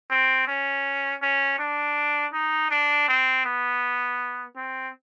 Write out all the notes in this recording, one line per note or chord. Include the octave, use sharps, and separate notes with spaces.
C4
C#4
C#4
D4
D#4
D4
C4
B3
C4